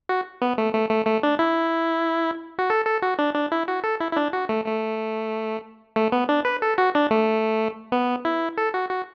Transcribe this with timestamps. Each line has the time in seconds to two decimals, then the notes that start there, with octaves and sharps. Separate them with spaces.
0.09 F#4
0.42 B3
0.58 A3
0.74 A3
0.90 A3
1.07 A3
1.23 D4
1.39 E4
2.59 F#4
2.70 A4
2.86 A4
3.02 F#4
3.19 D4
3.35 D4
3.52 E4
3.68 F#4
3.84 A4
4.00 E4
4.12 E4
4.17 D4
4.33 F#4
4.49 A3
4.66 A3
5.96 A3
6.12 B3
6.29 D4
6.45 B4
6.62 A4
6.78 F#4
6.95 D4
7.11 A3
7.92 B3
8.25 E4
8.57 A4
8.74 F#4
8.90 F#4